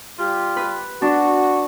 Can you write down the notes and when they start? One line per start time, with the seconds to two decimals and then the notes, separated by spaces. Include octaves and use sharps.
0.19 G3 F4 G4
0.57 B4
1.02 D4 F#4